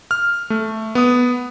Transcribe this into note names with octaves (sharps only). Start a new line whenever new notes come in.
F6
A3
B3 D#6